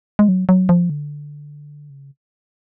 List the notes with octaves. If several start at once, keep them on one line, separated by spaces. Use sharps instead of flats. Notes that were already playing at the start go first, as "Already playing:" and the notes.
G#3
F#3
F#3
F3
D3
C#3